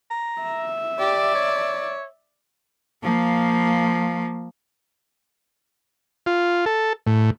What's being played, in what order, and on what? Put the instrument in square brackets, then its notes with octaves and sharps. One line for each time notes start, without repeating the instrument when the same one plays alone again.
[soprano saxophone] A#5
[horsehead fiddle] E5
[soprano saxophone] G4 [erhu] D5
[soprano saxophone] C#5
[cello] F3 A#3
[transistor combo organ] F4
A4
A2